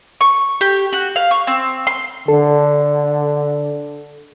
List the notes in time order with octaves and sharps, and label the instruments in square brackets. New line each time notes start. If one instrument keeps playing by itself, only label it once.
[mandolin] C#6
G4
F#4
F5
C#6
C4
C6
[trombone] D3 [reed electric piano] A4